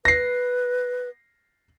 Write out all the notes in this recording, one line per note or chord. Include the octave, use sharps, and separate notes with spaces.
B4 A#6 C7